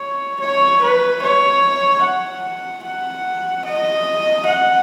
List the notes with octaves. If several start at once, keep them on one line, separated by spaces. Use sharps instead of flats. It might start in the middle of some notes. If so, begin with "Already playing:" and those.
Already playing: C#5
C#5
B4
C#5
F#5
F#5
D#5
F#5